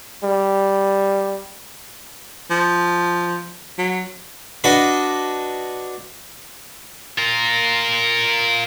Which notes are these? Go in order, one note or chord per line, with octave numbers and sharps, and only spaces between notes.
G3
F3
F#3
D4 F#4 B4 D#5
F4 A#4